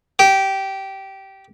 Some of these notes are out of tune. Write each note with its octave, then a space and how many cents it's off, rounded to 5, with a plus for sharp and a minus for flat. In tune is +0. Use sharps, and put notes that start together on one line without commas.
G4 -15